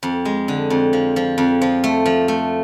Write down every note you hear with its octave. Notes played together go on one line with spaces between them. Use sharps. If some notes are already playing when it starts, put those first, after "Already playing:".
F2
G#3
D3
F2
F3
F3
F2
F3
A3
F3
A3